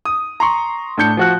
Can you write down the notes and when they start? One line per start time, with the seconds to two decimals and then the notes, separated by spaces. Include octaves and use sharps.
0.05 D#6
0.40 A#5 C6 C#6
0.98 A2 D4 G6 C#7
1.17 F3 F#4 F#6